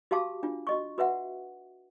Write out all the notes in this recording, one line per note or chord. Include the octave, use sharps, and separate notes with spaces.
F#4 G4 F5 A5 D6
D4 F4
F#4 D#5 C#6
F#4 B4 E5 F#5